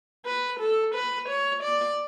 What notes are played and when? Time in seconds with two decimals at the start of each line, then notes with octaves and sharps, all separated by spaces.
0.25 B4
0.60 A4
0.94 B4
1.29 C#5
1.63 D5